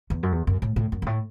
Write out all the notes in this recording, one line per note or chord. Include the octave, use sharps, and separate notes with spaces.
E2
F#2
E2
F#2
A2
A2
F#2
G2
A2